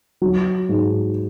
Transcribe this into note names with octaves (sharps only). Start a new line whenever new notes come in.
F#3
G#2